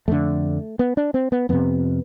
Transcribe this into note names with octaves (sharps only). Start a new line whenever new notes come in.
F2 D3 A3
B3
D4
C4
B3
F2 C3 B3